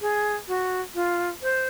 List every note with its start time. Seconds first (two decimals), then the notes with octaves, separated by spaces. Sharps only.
0.01 G#4
0.48 F#4
0.95 F4
1.42 C5